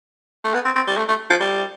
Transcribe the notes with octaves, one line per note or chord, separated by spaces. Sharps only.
A3
B3
C4
C4
G3
A3
A3
F3
G3